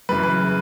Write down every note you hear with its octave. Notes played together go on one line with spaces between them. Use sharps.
F#2 C#3 E3 B4
B4